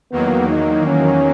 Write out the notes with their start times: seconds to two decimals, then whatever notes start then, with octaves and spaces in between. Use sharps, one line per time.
0.12 E2 D#3 F#3 A#3 B3
0.49 D#4
0.87 C#4